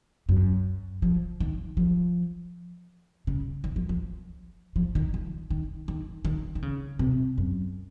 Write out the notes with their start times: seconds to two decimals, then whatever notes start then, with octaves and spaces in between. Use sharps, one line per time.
0.29 F#2
1.02 F3
1.40 D#3
1.77 F3
3.27 C#3
3.64 D#3
3.76 F3
3.89 F3
4.76 F3
4.95 D#3
5.14 F3
5.50 D#3
5.88 D#3
6.25 D#3
6.55 D#3
6.62 C#3
6.99 C3
7.38 F#2